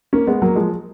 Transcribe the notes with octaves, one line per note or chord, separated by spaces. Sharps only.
A#3 C#4
G#3 B3
F#3 A#3
F3 G#3